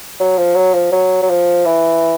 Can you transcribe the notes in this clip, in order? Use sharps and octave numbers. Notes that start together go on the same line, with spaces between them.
F#3
F3
F#3
F3
F#3
F#3
F3
E3